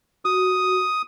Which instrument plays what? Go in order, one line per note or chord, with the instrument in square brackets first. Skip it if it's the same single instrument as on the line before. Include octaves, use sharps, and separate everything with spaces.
[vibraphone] F#4 [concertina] D#6